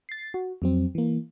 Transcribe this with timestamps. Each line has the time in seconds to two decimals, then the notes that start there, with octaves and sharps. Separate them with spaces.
0.09 A6 C7
0.34 F#4
0.62 F2 F#3 C4
0.95 E3 A#3